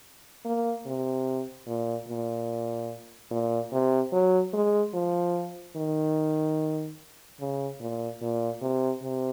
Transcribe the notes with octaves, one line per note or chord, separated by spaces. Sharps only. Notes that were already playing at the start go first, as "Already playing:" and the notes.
A#3
C3
A#2
A#2
A#2
C3
F#3
G#3
F3
D#3
C#3
A#2
A#2
C3
C3